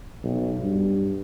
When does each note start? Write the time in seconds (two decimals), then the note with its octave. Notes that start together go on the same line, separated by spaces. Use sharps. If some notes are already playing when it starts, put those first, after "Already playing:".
0.24 B1
0.61 G2